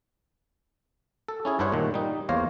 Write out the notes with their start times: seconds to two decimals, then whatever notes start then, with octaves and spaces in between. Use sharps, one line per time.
1.28 A4
1.45 C#4 E4 G#4
1.59 G2 D4 E4 C5 C#5 F#5
1.72 A#2 D#3
1.94 G3 D#4
2.29 E2 A#3 C5 C#5 F5 A#5